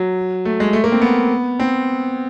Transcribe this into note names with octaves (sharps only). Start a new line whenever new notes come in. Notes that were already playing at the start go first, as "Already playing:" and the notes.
Already playing: F#3
A3
G#3
A3
A#3
C4
B3
C4